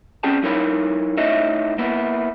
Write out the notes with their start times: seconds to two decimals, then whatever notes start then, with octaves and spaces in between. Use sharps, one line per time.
0.23 C4 C#4 G#4 D5 G5 A5
0.43 F#3 D#4 E4 A#4 C#5 B5
1.17 A2 D#4 E4 C#5 D#5 E5
1.78 A#3 B3 E4